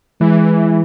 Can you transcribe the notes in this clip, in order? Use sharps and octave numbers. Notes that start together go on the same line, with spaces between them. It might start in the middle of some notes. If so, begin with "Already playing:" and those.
E3 G#3